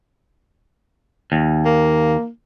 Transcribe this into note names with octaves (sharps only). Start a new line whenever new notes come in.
D#2
A#3